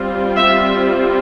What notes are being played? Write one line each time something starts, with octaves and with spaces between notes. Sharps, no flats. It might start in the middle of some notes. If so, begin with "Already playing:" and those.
Already playing: G3 C4 F4
E5